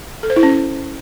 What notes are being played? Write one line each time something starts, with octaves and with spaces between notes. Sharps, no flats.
A4
C5
E4
C#4